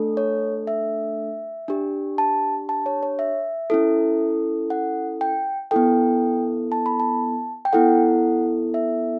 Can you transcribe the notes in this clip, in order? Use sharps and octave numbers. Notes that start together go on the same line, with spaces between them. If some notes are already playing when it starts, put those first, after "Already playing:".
Already playing: A3 D4 A4
C#5
E5
D4 G4
A5
A5
C#5
C#5
E5
C#4 E4 A4
F#5
G5
B3 E4 A4 G5
A5
B5
A5
G5
B3 E4 A4 F#5
E5